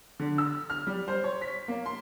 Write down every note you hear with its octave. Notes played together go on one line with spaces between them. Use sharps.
D3
E6
F6
G3
C5
C#5
B6
A#3
C6